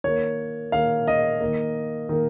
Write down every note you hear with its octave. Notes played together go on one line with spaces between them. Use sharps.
D#3 A#3 C#5
D#3 A#3 F5
D#5
D#3 A#3
D#3 A#3